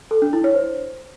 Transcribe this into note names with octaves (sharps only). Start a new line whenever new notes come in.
A4
D4
E4
C#5
C5